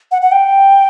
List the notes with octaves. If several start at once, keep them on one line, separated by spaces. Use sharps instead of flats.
F#5
F#5
G5